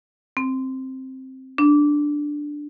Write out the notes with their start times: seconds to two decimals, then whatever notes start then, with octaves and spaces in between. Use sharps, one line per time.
0.37 C4
1.58 D4